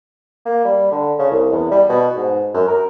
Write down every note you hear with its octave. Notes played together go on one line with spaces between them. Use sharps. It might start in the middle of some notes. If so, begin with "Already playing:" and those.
A#3
G3
D3
C#3
C2
E2
G3
B2
G#2
F#2
A#4